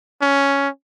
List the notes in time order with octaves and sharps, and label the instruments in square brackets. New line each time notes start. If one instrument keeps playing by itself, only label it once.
[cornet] C#4